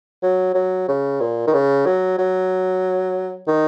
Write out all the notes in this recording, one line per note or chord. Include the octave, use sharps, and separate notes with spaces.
F#3
F#3
C#3
A#2
D#3
C#3
F#3
F#3
D#3